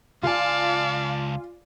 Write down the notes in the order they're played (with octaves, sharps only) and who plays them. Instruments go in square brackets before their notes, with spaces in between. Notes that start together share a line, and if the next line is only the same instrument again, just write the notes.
[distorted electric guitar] C#2 A5 [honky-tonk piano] F4 G#5 [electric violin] D5 F5